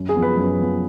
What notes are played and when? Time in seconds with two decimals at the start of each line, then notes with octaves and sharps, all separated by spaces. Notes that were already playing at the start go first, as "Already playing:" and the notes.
Already playing: F#2
0.09 G#4
0.15 F3 B3
0.22 B4
0.37 F#2
0.59 F3 B3